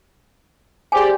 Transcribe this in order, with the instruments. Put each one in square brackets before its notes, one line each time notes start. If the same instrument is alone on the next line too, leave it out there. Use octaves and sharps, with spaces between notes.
[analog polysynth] G4 C5 D5 [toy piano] G#4 G#5